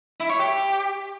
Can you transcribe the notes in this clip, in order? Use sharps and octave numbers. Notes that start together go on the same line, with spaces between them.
E4
C#5
G4